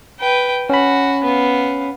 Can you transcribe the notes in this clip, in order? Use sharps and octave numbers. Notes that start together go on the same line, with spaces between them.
B4 G5
C#4 F#4 B5
B3 F5